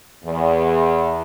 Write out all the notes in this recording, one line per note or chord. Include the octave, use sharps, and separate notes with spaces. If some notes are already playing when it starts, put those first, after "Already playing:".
E2